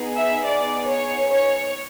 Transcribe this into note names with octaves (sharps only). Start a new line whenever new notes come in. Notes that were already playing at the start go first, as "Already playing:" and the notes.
Already playing: B3 D#4 G#4
E5
D5
C#5
C#5